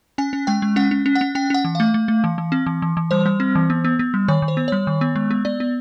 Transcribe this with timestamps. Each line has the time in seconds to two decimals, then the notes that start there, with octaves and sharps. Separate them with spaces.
0.18 C#4 G#5
0.33 C#4
0.47 G#3 G5
0.62 G#3
0.76 C#4 F#5
0.91 C#4
1.06 C#4
1.15 F#5
1.21 C#4
1.35 C#4 G5
1.50 C#4 F#5
1.65 E3
1.75 A3 F5
1.94 A3
2.08 A3
2.24 E3
2.38 E3
2.52 C4
2.66 E3
2.82 E3
2.97 E3
3.11 G3 C5
3.26 G3
3.40 C4
3.55 E3
3.70 B3
3.85 B3
3.99 B3
4.14 G3
4.28 D#3 C#5
4.42 D#3
4.48 C5
4.57 B3
4.68 G3 C#5
4.87 D#3
5.01 B3
5.16 G#3
5.31 B3
5.45 B3 D5
5.60 B3